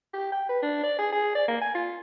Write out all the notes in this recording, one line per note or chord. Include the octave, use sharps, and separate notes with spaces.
G4
G5
B4
D4
D5
G#4
G#4
D5
A#3
G#5
F4